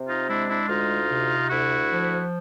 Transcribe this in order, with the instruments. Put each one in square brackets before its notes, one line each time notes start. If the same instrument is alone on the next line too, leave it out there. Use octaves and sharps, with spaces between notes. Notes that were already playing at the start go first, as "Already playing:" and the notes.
Already playing: [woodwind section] C3
D#4 F4
G#3 D4 E4
D4 E4
D2 D#4 F4
C3
D2 E4 F#4
F3